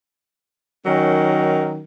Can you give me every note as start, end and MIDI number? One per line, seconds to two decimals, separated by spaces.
0.86 1.83 51
0.86 1.83 54
0.86 1.83 61
0.86 1.83 63
0.86 1.83 70